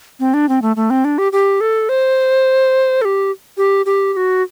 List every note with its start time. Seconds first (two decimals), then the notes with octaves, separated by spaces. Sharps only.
0.20 C4
0.34 D4
0.49 C4
0.62 A3
0.76 A3
0.90 C4
1.04 D4
1.18 G4
1.32 G4
1.61 A4
1.89 C5
3.01 A4
3.05 G4
3.57 G4
3.86 G4
4.13 G4
4.16 F#4